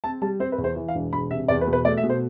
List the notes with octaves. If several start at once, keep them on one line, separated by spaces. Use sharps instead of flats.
C4 A5
G3 A5
C4 C5
B4
E2
C5
E3
F5
E1
E1 B5
C3 E5
E2 D5
B4
B2
B4
A3 D5
E5
B2
C5